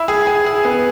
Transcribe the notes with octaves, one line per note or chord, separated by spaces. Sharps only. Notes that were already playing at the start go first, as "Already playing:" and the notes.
Already playing: E4
G#4
G#4
G#4
B3